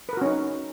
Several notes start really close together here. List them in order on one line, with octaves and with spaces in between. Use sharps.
B4 A#4 F#4 C#4 D#4